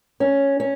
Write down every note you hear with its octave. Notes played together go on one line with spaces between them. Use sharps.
C#4
C#4